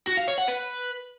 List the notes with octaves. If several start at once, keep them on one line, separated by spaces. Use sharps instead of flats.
F#4
F5
C#5
F#5
B4